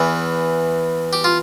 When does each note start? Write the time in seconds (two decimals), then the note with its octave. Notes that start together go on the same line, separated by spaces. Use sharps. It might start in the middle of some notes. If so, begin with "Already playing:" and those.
Already playing: E2 E3
1.13 G4
1.24 F4